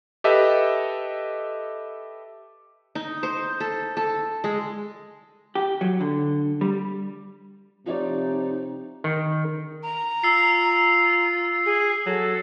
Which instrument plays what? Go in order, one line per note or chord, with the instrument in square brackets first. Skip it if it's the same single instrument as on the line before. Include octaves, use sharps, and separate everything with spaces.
[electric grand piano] G4 A4 B4 D#5 E5
[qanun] D#4
C5
A4
A4
G#3
[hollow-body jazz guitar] G4
F#3
D3
G3
[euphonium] C3 [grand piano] F3 C#5 D5 [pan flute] D#4
[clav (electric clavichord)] D#3
[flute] A#5
[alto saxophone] F4 [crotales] E6 C7
[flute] G#4
[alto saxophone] F#3 [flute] A4